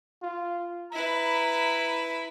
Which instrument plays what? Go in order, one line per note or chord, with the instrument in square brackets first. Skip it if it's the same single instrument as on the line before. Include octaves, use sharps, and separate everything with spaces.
[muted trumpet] F4
[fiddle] E4 B4 [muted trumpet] A#5